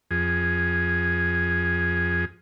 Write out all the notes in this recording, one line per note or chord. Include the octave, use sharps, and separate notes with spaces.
F2 G#4